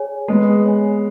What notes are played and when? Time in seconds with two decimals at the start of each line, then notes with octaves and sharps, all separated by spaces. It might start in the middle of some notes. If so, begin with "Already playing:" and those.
Already playing: G#4 C#5 G#5
0.28 G#3 B3 G#4
0.65 C#5 G#5